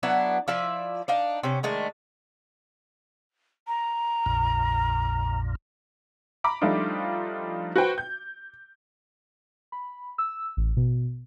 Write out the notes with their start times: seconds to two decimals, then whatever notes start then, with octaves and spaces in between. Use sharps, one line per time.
0.03 F#3 B3 D4 E4
0.48 F3 E4 D5 E5
1.08 D4 D#4 F5
1.43 C3 C#4
1.63 D#3 G#3 A3 D4
3.68 A#5
4.26 A#1 F2 A#2
6.44 A#5 B5 D6
6.61 F3 G3 A3 D4 D#4 F4
7.76 F#4 B4 C5 G5
7.98 G6
9.72 B5
10.18 E6
10.57 A1
10.77 B2